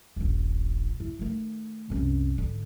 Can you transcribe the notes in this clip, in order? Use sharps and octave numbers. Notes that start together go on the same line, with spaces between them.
D#1 A#1
E4
D#3 A3
C2 F#2
G#2 D3